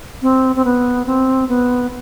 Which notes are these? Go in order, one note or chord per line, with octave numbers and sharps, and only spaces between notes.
C4
C4
B3
C4
B3